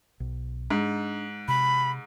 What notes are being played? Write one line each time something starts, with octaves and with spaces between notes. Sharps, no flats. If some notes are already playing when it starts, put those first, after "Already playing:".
B1
G#2 D4
C3 B5